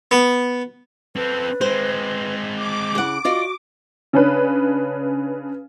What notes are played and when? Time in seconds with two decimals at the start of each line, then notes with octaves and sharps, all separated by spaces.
0.11 B3
1.16 C4 A4 B4
1.61 G#3 C4 C5
2.55 D6
2.95 C#3 E4 F#5
3.25 F4 F#4 D5 D#5
4.13 C#3 C#4 D4 B4